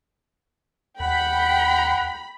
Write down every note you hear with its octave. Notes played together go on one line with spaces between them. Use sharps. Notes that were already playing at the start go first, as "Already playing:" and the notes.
D#2 F#5 G5 B5